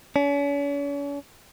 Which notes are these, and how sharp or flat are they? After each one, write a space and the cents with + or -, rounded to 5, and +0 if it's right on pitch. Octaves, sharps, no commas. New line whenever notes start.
C#4 +45